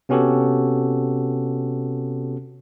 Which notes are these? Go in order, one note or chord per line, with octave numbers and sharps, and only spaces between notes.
C3 B3 C#4 F#4 G4 A4